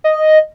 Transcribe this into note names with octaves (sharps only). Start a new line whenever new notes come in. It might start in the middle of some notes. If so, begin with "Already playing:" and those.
D#5